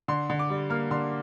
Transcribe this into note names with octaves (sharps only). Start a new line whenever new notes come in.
D3 C6
D3
D6
G3
A#3 F6
D3 C6